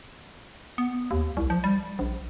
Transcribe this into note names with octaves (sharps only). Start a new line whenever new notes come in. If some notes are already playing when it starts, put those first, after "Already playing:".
B3
D#2
C2
F3
G3
A#1